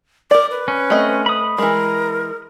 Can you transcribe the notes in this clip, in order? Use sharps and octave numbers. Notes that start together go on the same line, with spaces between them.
A#4 D5 D6
B4
C#4
A3 C4 D#5
B5 D#6
E3 G#3 A#4